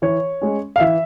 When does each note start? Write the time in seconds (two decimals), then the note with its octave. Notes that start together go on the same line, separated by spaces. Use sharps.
0.02 E3 C#5
0.41 G#3 C#4
0.76 F5
0.80 E3 E5